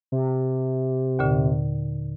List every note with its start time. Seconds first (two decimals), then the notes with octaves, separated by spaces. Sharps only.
0.12 C3
1.19 D#2 A#2 D3